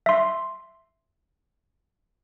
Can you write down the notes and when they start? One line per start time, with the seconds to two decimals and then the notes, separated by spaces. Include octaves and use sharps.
0.06 E5 C6